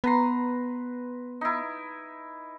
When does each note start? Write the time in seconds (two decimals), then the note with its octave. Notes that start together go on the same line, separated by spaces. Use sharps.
0.04 B3 B4 A#5 C6
1.41 D#4 E4